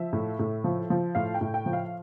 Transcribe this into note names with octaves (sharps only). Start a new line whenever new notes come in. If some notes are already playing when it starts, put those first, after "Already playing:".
Already playing: F3 E5
A2
A2
F3
F3
A2 F5
G5
A2
G5
F3
F5